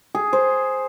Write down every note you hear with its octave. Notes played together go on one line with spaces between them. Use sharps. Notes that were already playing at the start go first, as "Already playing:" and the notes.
G#4
C5